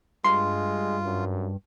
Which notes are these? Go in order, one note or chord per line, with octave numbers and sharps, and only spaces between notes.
G2 G#3 F4 C6
F#2